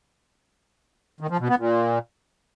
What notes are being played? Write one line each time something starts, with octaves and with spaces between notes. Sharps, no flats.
D#3
F3
B2
B3
A#2